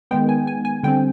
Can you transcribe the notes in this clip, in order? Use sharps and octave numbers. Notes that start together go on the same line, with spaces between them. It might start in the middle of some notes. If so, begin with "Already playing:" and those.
D#3 G#3 B3 G5
G#5
G#5
G#5
D3 G3 C4 G5